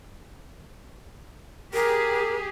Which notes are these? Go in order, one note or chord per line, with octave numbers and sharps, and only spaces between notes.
G4 G#4 A#4